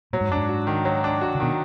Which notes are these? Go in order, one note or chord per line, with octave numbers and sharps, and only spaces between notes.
A#2 F#3
G#2
F#2
G#2 D4
F#4
D#3
F#3
D4
F#4
D3
B2 D#3